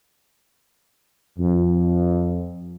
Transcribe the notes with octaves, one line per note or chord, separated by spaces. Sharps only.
F2